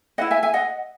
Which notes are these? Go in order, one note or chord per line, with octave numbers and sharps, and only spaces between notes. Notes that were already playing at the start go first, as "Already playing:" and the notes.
E4 B4 D#5 F#5
E5 G#5
E5 G#5
D#5 F#5